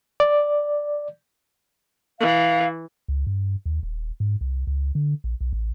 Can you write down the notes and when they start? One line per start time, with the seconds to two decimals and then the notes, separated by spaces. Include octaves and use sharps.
0.20 D5
2.20 E3 F5
3.08 C#2
3.27 G2
3.66 D#2
3.83 D#1
4.20 G#2
4.41 C2
4.67 C#2
4.95 D3
5.24 A#1
5.41 B1
5.53 A1